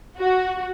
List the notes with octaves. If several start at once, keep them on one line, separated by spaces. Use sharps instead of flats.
F#4